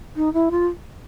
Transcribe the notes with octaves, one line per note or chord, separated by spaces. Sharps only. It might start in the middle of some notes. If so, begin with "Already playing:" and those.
D#4
E4
F4